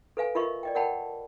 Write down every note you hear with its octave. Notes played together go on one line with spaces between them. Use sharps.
A4 B4 F5 G#5
F4 A#4 D#5 E5 B5 C#6
D5 D#5 G5
A#4 C#5 F#5 G5 A5 B5